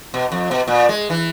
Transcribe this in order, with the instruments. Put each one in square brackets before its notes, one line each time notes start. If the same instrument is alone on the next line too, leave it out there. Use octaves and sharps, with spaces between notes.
[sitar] B2
F2
B2
A#2
G#3
E3